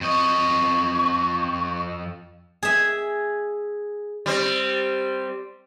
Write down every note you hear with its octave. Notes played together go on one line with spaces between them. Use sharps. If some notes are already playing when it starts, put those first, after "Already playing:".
F2 D#5 C#6
G#4 E5
G3 C4